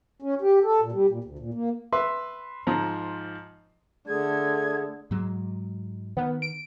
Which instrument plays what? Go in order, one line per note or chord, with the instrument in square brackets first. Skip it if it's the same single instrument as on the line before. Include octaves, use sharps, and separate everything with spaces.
[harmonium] C#4
G4
A4
A#2
G3
A#2
D2
A#2
A#3
[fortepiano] B4 E5 [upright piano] C6
[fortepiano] G#2 F3 A#5
[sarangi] D3 [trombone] A3 [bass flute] G#4 [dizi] G#6
[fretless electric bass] G#2 F#3 G#3
[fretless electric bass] D#3 [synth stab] B3
[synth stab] D7